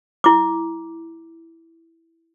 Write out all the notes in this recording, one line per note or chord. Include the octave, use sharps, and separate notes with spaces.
E4 D6